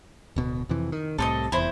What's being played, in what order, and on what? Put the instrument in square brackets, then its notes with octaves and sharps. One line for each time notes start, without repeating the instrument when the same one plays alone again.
[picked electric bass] D1 B2
F2 C3 E3
D#3
[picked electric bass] C2 A2 C3 [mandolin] A4 C5 D#5
[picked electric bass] F1 E2 [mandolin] E4 C5